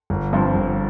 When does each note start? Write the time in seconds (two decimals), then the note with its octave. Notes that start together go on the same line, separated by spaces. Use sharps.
0.10 G1
0.33 G2 F3 C4
0.55 G1